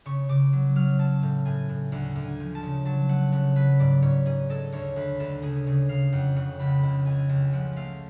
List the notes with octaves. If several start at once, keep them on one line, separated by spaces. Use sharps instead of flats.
C#3 C#6
C#3 D6
F#3
F#3 F6
F#3 A5
A2
A2 G#5
A2
D2 F#5
D2
G#5
F3
A5
C#3
F#3 A5
A3 F#5
C#3 F#5
F#3 B4
G#2 D5
G#2 C#5
G#2 G#4
G#3 A4
D2 C#5
D2 B4
D2 A4
C#3 G#4
C#3 G#4
C#3 F5
F2 F#5
C#3 F#5
C#2 B5
C#2
C#2 G#5
C#2
F3 F#5
A3 F5